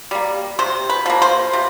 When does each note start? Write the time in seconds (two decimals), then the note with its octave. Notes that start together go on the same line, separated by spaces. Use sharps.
0.11 G3 A#3
0.59 C3 C5
0.89 B4
1.06 F3 A#3
1.22 C5
1.53 C3